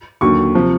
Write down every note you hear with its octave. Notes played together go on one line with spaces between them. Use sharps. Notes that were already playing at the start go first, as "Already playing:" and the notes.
D#2 D3 F#3 C#6
C3 F3